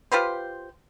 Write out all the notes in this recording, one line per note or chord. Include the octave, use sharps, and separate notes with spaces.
F4 G4 B4 C5